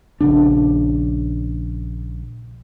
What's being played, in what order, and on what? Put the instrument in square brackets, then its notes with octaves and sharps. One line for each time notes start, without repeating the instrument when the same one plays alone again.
[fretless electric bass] A#1 C#3 D4